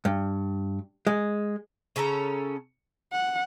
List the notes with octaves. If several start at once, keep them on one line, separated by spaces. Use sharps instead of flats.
G2
G#3
C#3 C#4 A4 A#5
F#5